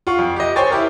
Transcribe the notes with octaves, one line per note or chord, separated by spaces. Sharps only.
F4 F#5 C#6
F2
G4 D#5
C5 C#5 G5 G#5 C#6 A6
E4 G4 A#4